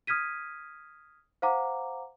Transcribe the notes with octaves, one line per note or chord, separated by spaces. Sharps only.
D#6 F6 G#6 B6 D#7
C5 F5 F#5 A#5 D6